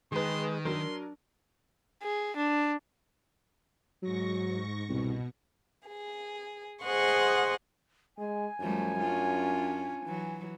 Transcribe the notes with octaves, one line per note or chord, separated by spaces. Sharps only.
D#3 G#3 G#4 B4 C6
F#3 D4 A#4 C6
G#4
D4
G#2 F#3 C#6 A#6
C2 B2
G#4
G#4 C5 D#5 F#5 C6 C#6
G#3 G#5
F#2 F3 G3 A3
C#4 D4 F4
E3 F#3